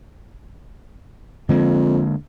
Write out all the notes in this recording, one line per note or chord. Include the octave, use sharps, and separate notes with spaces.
F2 D3 G#3 A#3